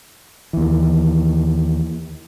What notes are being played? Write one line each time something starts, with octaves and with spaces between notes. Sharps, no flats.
D#2 E3